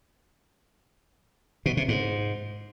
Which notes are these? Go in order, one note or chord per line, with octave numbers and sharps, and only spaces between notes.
B2
C3
G#2